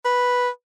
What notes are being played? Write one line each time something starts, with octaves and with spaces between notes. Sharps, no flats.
B4